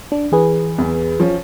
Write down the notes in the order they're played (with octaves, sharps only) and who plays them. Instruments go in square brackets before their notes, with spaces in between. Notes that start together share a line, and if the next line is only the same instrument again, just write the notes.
[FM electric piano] D4
E3 G#4 B4
[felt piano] E2
F3 C#4